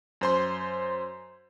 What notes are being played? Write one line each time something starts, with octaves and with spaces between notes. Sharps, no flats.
F#2 C5 C6